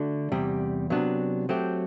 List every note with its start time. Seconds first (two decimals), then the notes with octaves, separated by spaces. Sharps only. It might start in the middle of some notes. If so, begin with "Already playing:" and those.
Already playing: D3 A3 D4 F#4
0.32 E2 C3 G3
0.90 C3 F#3 B3 D4
1.49 F#3 A3 C4 G4